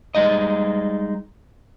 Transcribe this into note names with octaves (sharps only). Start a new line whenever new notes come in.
G3 G#3 D#4 D#5